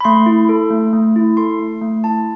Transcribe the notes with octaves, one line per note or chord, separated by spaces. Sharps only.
B5
A3 C6
E4
A4
A3
A3
E4
A4 C6
A3
A3
E4 A5